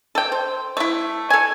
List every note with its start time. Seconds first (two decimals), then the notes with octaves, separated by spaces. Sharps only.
0.15 A4 G5
0.32 C5
0.77 A3 E4
1.30 A4 G#5